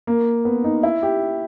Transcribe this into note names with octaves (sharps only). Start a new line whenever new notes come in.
A#3
B3
D#4
E4
G4